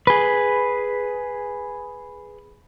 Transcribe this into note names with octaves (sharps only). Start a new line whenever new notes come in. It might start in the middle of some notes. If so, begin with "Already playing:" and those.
G#4 B4